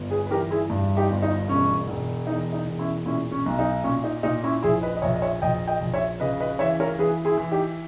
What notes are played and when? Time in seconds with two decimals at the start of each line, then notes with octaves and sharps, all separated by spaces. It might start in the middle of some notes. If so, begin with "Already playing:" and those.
Already playing: G1
0.11 G#4 B4
0.26 B4
0.31 E3 G4 A#4
0.51 E4 G#4
0.70 G2
0.97 D#4 G4
1.10 G1
1.22 D#4
1.48 E1 C#4
1.88 E1
2.27 E2 D#4
2.53 D#4
2.67 E1
2.79 C#4 E4
3.05 A#2 C#4 E4
3.32 C#4
3.46 B1
3.59 D#4
3.84 A#2 C#4
4.04 D#4
4.23 A#2 D#4
4.43 C#4 E4
4.63 A#1 E4 G#4
4.83 B4 D#5
4.97 D#5
5.02 A#1 C#5 E5
5.16 D#5
5.22 C#5 E5
5.42 A#1 D#5 G5
5.67 D#5 G5
5.80 A#1
5.94 C#5 E5
6.20 C#3 B4 D#5
6.40 B4 D#5
6.59 E3 C#5 E5
6.80 A#4 C#5
6.99 E3 G#4 B4
7.25 E4 G#4
7.38 E3
7.51 D#4 G4